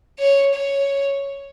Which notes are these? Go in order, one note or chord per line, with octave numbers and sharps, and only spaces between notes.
C#5
C#5